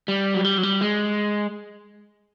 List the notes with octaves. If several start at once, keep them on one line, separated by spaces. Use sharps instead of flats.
G3
F#3
G3
F#3
G3
G#3